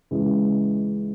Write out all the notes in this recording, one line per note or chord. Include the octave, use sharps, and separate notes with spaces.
C#2 C#3 E3 G#3